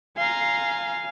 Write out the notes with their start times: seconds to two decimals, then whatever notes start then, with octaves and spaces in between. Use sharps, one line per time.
0.17 F5 G#5 A#5 C6